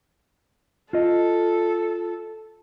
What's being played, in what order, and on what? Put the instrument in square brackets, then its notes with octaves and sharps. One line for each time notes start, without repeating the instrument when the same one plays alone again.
[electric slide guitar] F4 D#5 [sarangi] A4